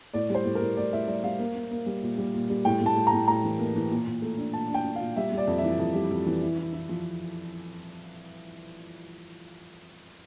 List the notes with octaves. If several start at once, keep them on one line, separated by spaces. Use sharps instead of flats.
A2 D5
G3 C5
A2
A#4
A2
A2 D5
A2 E5
G3 D5
G3 F5
A#3
A#3
A#3
G3
A#2
G3
A#2
G3
A2 G5
A2 A5
A2
A#5
A2
A2 A#5
E3
A#3
E3
A#2
A#2
A3
D4
A#2 A5
D4 G5
D4
A#2 F5
G3 E5
G3
D5
F2
E5
E3
F2
G3
F2
E3
E4
E4
E4
F3